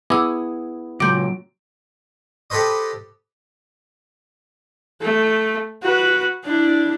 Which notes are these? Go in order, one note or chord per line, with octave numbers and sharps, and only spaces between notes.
B3 E4 G#4 D6 E6
C#2 A#2 F#3 D6 G6 D7
G4 A4 B4 C5 D#5
A3
F#4 B4
D4 E4